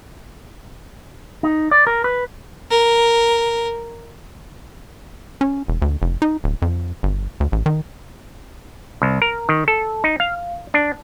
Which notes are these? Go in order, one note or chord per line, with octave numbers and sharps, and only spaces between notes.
D#4
D5
A#4
B4
A#4
C#4
E1
D2
F1
D#4
D1
F2
G1
D2
A1
D#3
C2
A#4
D#3
A4
D#4
F5
D4